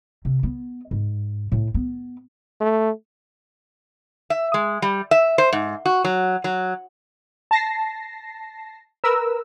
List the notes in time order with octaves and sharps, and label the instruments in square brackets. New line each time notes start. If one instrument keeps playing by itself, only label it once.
[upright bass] C3
B3
G#2
A2
B3
[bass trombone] A3
[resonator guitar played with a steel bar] E5
G#3
G3
E5
C5
G#2
F#4
F#3
F#3
[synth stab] A5 A#6 C7
A#4 B4 E6